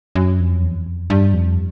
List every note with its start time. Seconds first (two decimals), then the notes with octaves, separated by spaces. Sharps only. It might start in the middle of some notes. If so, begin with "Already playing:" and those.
0.15 F#2
0.40 F2
0.63 E2
0.87 F2
1.10 G2
1.34 F2